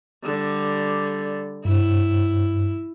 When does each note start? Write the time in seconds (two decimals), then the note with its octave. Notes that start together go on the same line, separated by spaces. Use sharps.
0.24 D3 G3
1.65 G2 E4